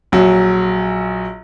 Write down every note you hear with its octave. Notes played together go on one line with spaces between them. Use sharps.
A#1 F#3